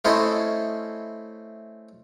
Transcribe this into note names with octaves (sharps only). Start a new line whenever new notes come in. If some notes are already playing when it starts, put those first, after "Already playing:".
A3 C4 C#4 E4 D#5